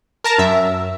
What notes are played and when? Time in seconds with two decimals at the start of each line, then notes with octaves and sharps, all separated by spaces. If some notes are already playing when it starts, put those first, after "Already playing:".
0.24 A#4 A5 A#5
0.38 F#2 E5